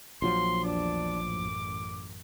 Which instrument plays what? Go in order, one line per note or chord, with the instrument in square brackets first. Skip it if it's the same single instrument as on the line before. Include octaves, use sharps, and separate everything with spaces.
[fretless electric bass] A#1 F3 F#3 [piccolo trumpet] C6
[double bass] E2 D4 [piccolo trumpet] D6
[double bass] A1 F#2